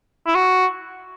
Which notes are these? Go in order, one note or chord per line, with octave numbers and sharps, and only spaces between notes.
E4
F#4